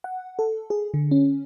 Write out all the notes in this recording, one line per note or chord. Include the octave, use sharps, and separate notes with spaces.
F#5
A4
G#4
D3
C#4